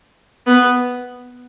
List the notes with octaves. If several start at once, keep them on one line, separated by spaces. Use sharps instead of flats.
B3